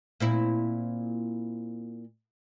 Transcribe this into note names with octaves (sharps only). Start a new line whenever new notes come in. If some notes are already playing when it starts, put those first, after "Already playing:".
A#2 C4 E4